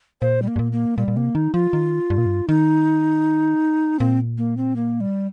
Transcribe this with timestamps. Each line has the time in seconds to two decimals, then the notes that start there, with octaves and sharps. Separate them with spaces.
0.21 A#2 C5
0.42 G3
0.48 A#3
0.56 G2
0.59 A#2
0.72 A#3
0.97 A#2 G3
1.08 A#2
1.16 C3 A#3
1.35 D#3 D#4
1.54 F3 F4
1.73 D#3
2.10 G2
2.18 A#2
2.26 G2
2.48 D#3 D#4
3.99 A#2 C4
4.38 A#3
4.57 C4
4.76 A#3
5.01 G3